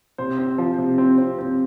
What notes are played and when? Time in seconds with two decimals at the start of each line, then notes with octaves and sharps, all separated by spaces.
0.18 C3 C5
0.38 C4
0.58 F3
0.78 C3
0.98 C4
1.18 C4
1.39 C4